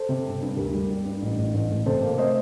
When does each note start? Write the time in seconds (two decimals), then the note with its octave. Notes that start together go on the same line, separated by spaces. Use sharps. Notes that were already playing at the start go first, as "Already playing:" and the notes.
Already playing: A4 C5
0.09 C3
0.25 G1
0.41 G2
0.57 D2 G4 A#4
0.73 G3
0.90 G3
1.05 G2
1.22 A1
1.38 A1
1.54 A1
1.70 A1
1.86 C3 A4 C5
2.02 A#3
2.18 A3 C5 D#5